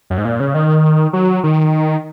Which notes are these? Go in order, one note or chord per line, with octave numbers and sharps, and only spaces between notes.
F#2
G#2
A#2
C#3
D#3
F#3
D#3